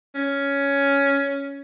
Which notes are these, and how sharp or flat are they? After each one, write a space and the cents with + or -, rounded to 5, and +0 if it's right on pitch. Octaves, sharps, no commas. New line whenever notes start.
C#4 +10